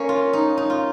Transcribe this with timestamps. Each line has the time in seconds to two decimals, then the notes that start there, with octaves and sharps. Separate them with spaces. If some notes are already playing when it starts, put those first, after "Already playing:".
Already playing: A#3 C#4
0.09 F4
0.33 D#4
0.57 D#4
0.70 F4